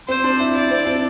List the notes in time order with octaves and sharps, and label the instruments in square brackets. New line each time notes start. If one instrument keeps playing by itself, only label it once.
[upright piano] C4 [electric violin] C5
[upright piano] D4
E4
[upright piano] E4 [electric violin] D5
[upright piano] C4
E4
D4